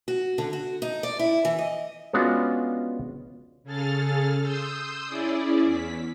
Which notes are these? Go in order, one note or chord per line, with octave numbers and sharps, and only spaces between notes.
F#4
D3
F#4
D#4
D5
E4
E3
D#5
G#3 B3 C#4 D4 F4 F#4
C#3 G#4 A4 F6 A6
C6 D#6 E6 G6
C#4 E4 G#4 D5
E2 B6